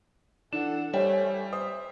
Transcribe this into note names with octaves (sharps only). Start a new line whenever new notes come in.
E3 D4 A4 F#5 E7
G3 A3 C5 C#5 G5 G#5
C5 E5 D#6